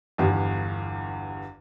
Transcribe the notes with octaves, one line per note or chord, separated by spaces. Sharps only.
G1 E2 G2